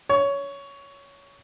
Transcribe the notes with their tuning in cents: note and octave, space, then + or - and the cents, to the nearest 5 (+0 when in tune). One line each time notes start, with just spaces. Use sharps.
C#5 +15